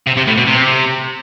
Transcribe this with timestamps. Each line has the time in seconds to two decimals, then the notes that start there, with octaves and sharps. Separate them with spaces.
0.07 C3
0.17 C3
0.27 A2
0.38 B2
0.47 C3